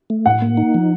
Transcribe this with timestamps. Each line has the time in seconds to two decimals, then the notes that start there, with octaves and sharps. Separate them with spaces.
0.10 A3
0.26 A2 F#5
0.42 A#3
0.57 D#4
0.74 F3